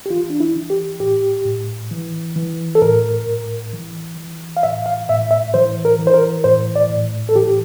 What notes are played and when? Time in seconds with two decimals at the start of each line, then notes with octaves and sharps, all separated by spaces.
0.06 G4
0.10 E3 F4
0.30 D4
0.40 E4
0.56 E3
0.70 G4
1.00 A2 G4
1.46 A2
1.91 E3
2.36 E3
2.75 A4
2.82 A2 A#4
3.27 A2
3.73 E3
4.17 E3
4.57 F5
4.63 A2 E5
4.86 F5
5.09 A2 E5
5.31 E5
5.54 E3 C5
5.85 A#4
5.99 E3
6.07 C5
6.14 A#4
6.44 A2 C5
6.76 D5
6.90 A2
7.29 A4
7.36 E3 G4
7.47 G4